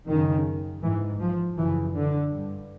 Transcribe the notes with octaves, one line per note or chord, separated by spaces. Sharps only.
F#2 D#3
C#3
G#2 E3
F3
F#2 C#3 E3
D3
G2